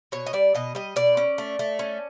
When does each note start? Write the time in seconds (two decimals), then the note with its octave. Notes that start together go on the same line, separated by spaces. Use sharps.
0.12 B2 C#5
0.26 D#5
0.33 G3 D5
0.55 B2 D#5
0.75 G3 D#5
0.96 B2 D5
1.17 C#4
1.38 A3
1.59 A3
1.79 C#4